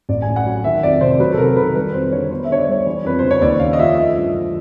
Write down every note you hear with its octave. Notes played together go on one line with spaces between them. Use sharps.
A1 D5
A2 G#5
F#5
F#3
D#3 E5
F2 D5
C3 C5
F#3 B4
A4
C3 A#4
D#3 B4
G3 B4
F2 C5
D3 C#5
B3 C5
E5
D3 C#5
D5
G3 C#5
E3
F2 B4
C#3 C5
C#5
D#2 D5
C#3 F5
D#5
F3 E5
A3 E5
G2
E3